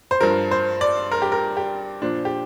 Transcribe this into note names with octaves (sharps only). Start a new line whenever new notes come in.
C5
G2 F3 A#4
C5
D5
A#4
G4
A#4
G4
A#2 F3 D4
G4